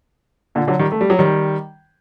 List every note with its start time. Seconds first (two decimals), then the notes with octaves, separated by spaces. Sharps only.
0.55 A#2 D3
0.68 D3 F#3
0.79 D#3 G3
0.92 A3
1.01 G3
1.10 F#3
1.19 D#3 G3